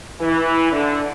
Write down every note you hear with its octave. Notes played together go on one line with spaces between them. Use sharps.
E3
D3